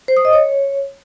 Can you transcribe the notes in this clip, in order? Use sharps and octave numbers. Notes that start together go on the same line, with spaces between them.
C5
D#6
D#5
C#5